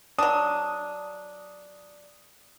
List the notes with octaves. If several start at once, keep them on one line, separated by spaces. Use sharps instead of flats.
F#3 D4 D#6